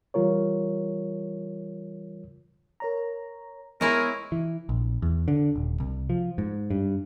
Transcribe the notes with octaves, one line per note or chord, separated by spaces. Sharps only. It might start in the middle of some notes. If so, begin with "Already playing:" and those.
E3 G3 F4 A#4 C#5
A#4 C#5 A#5
G#3 B3 E4 G#4 A#4 C#5
E3
A#1
E2
D3
D#1
C2
F3
G#2
G2